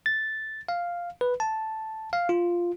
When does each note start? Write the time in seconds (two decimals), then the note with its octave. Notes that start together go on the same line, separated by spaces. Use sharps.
0.06 A6
0.69 F5
1.21 B4
1.40 A5
2.13 F5
2.29 F4